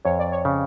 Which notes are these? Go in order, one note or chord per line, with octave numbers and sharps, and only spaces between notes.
F2 C#5
D5
C#5
C#3